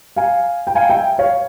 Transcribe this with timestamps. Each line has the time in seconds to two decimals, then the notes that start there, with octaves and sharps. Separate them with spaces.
0.16 F5 G#5
0.67 G5
0.75 F5 G#5
0.90 E5 G5
1.18 C#5 F5